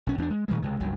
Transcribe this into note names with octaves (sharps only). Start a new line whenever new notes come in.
B1 C#4
E2 C#4 D4
G#3
A#2 D#3 G3 G#3
C#2 C3 G#3
F#1 C#2 G2 F#3